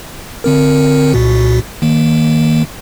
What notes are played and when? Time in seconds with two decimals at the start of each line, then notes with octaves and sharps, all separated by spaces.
0.44 D3 C4 A#4
1.14 C2 A#2 F#4
1.82 D#3 A#3